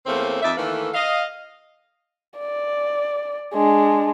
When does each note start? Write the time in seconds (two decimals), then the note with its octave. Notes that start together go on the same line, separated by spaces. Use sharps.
0.07 E2 A3 A#3 C4 C#4 C5
0.43 F2 D#4 D5 E5
0.57 D#3 E3 A3 A#3 A4 B4
0.94 D#5 F5
2.39 D5
3.54 G#3 D4